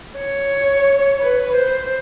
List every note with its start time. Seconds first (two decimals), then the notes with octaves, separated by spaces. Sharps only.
0.18 C#5
1.20 B4
1.55 C5